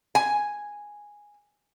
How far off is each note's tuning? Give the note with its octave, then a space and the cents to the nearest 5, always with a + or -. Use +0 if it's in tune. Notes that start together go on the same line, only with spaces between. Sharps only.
G#5 -5